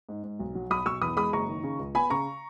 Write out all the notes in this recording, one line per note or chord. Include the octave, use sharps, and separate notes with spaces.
G#2
G#2
B1
F#3
B1 B5 D#6
B1 C#6 E6
E2 B5 D#6
G#3 B5 D#6
F#1 A#5 C#6
D#3
C#3
C#2
B3 G#5 B5
C#3 A#5 C#6